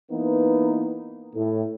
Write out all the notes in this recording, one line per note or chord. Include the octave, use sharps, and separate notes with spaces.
E3 A#3 B3 D#4
A2